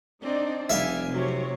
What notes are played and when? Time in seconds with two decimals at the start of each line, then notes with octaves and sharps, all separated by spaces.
0.23 C4 D4 D#4 D5
0.70 F1 G3 E5 F5 G#5
1.11 C3 F#3 C#5